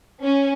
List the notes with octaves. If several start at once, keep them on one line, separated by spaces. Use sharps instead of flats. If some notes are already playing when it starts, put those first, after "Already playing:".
C#4